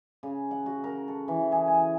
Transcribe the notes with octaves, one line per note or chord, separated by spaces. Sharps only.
C#3
F#5
F#4
A#4
A4
E3
G#4
G#5